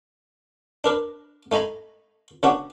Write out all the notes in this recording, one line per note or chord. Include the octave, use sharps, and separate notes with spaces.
D4 A#4 B4
A3 D#4 G#5 A#5 B5
C#3 B3 D4 F#4